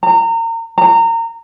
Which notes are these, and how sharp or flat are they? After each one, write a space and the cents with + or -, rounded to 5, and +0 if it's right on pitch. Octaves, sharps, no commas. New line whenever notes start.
A#5 -30
A#5 -25